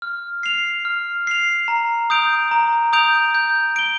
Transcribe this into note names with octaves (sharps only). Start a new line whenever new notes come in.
F6
C7 F7
F6
C7 F7
A#5
D#6 G6 D7 F7
A#5
D#6 G6 D7 F7
G6
D7 G7